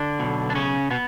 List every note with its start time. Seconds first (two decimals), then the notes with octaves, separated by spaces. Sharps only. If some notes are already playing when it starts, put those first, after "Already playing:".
Already playing: D3 D4
0.19 B1 B2
0.50 D4
0.55 C#3 C#4
0.91 B2 B3